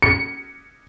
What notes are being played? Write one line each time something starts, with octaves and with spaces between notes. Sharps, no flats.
C#7